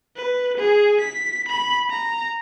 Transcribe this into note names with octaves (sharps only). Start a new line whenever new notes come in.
B4
G#4
B6
B5
A#5